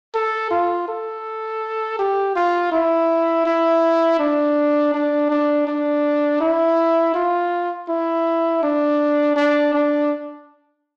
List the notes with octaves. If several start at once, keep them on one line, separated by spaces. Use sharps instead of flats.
A4
F4
A4
G4
F4
E4
E4
D4
D4
D4
D4
E4
F4
E4
D4
D4
D4